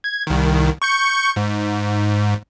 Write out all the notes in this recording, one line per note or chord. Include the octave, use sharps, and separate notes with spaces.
G#6
C2 D#3
C#6 G6 C#7
G#2